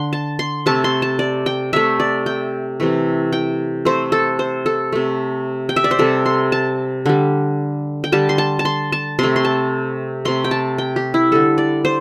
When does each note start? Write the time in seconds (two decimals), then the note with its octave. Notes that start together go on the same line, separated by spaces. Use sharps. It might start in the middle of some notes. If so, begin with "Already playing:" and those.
Already playing: D3 C6
0.13 A5
0.39 C6
0.66 C3 A3 A5
0.84 C6
1.02 A5
1.19 D5
1.46 G5
1.73 C3 A3 E5
2.00 D5
2.26 G5
2.80 C3 E3 A3
3.33 G5
3.85 C3 A3 C5
4.12 A4
4.39 C5
4.66 A4
4.92 C3 A3
5.69 G5
5.76 E5
5.84 D5
5.91 C5
5.99 C3 G3 A4
6.26 C6
6.52 A5
7.06 D3 G3
8.04 G5
8.12 D3 G3 A5
8.29 C6
8.38 A5
8.59 A5
8.65 C6
8.92 A5
9.19 C3 A3 C6
9.36 C6
9.45 A5
10.25 C3 A3 C6
10.44 G5
10.51 A5
10.78 G5
10.96 G4
11.14 E4
11.32 D3 G3 A4
11.58 D5
11.85 C5